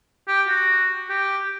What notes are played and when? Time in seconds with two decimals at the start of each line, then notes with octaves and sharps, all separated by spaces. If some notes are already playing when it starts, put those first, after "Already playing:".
0.28 G4
0.48 F#4
1.09 G4